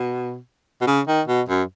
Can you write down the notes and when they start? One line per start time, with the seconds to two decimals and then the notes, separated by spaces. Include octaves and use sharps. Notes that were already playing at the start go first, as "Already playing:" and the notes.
Already playing: B2
0.81 B2
0.87 C#3
1.08 D#3
1.28 B2
1.48 F#2